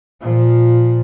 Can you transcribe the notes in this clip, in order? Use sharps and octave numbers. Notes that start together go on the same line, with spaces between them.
A#2 F3